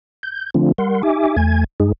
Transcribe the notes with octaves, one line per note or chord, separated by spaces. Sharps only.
G6
D3 F3 A3 C4 D4 F4
G3 A#4 F#5 C6
D#4 G4 E5 G#5 D6
E2 A3 G#5 G#6
G2 G#3 D#4 G#4